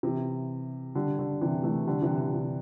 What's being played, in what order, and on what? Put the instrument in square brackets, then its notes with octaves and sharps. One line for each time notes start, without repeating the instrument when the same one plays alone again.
[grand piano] C3 E3
D3 G3
D3
C3 E3
E3 A3
D3 G3
C3 E3
D3
C3